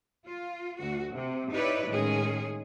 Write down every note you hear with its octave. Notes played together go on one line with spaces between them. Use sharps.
F4
D2 F#4
C3
D#4 E4 G4 B4 C#5 D5
A2 D#3 G#3 C#4 G#4